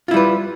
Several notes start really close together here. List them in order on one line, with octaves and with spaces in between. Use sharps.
F4 E4 G3 B4